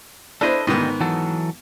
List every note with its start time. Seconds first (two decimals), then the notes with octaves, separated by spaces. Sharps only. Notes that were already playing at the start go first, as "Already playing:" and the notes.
0.41 D4 E4 A4 B4 C5 D#5
0.67 D2 G#2 D#3 G3 B3 D#5
1.00 E3 F#3 A4